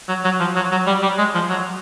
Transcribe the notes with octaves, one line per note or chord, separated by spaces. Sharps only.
F#3
F#3
F3
F#3
F#3
G3
G3
G#3
F3
F#3